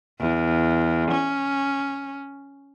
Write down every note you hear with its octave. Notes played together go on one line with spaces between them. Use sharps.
E2
C#4